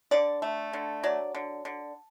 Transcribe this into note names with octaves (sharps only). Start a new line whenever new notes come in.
D3 D5
A3
D3
F#3 D5
D3
D3